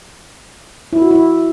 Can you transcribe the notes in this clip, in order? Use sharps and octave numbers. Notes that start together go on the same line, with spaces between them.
E4
F#4
E4